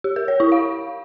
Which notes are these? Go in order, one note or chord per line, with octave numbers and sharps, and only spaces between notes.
G4
A#4
C#5
E4
F5